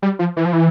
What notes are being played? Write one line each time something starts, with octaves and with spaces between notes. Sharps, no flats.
G3
F3
E3
F3
E3